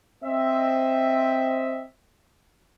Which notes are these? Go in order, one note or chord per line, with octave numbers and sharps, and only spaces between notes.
C4 D#5 E5